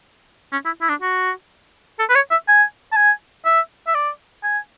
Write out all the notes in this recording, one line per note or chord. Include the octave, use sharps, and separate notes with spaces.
C#4
E4
E4
D4
F#4
A4
B4
C#5
E5
G#5
A5
G#5
E5
E5
D5
G#5